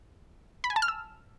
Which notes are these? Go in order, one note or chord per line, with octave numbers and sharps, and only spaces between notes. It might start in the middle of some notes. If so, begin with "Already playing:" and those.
B5
G#5
A5
F6
E6